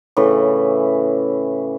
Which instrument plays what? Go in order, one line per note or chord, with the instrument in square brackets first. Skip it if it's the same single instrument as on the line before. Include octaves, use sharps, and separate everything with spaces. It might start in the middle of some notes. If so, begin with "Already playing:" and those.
[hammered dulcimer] A2 C#3 E3 B4